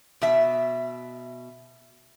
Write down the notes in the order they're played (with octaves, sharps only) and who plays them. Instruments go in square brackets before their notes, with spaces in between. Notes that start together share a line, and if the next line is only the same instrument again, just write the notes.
[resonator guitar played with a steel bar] B2 E5